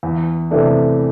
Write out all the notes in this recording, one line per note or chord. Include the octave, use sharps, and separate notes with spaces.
E2
C3 E3 A3 D4